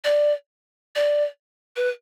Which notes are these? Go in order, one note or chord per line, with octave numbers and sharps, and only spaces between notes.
D5
D5
B4